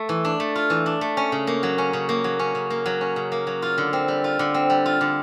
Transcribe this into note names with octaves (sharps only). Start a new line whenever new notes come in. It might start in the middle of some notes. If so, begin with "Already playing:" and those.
Already playing: A3
E3
D4
A3
F4
E3
D4
A3
C#4
C#3
A#3
F#3
C#4
C#3
A#3
F#3
C#4
C#3
A#3
F#3
C#4
C#3
A#3
F#3
F4
D3
C4
G3
F4
D3
C4
G3
F4
D3